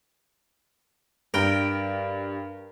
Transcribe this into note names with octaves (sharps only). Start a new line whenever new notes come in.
G2 A#4 G5